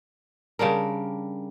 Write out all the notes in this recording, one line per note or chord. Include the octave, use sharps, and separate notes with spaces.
C#3 G3 D4 A#4